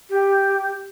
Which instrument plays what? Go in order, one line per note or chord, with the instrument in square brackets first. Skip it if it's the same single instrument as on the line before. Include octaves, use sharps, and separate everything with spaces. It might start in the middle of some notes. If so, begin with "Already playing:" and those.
[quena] G4